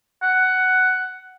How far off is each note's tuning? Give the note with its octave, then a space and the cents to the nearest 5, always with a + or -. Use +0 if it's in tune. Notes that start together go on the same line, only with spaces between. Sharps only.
F#5 +10